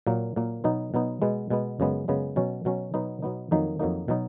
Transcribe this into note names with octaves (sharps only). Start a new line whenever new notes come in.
A#2 F#3 A#3
A#2 F#3 A#3
B2 F#3 B3 D#4
B2 F#3 B3 D#4
B2 G#3 B3
B2 G#3 B3
F#2 C#3 G#3 B3
F#2 C#3 G#3 B3
B2 F#3 C#4
B2 F#3 C#4
B2 F#3 B3 D#4
B2 F#3 B3 D#4
F2 D#3 F#3 A#3 D#4
F2 D#3 F#3 A#3 D#4
B2 F#3 B3 D#4